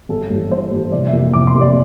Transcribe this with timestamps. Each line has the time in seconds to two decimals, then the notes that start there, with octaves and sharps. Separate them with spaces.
0.09 G1 A4
0.30 G2 E3
0.51 G1 C5
0.71 G2 E3
0.92 F1 D5
1.07 E5
1.13 F2 C3 E3 A#3
1.33 F1 D6
1.47 C6
1.54 F2 C3 E3 A#3
1.61 D5